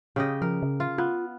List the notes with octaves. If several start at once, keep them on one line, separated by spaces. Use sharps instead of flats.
C#3 G4 D#5
F3 A#4
C#3
F4
B3 F4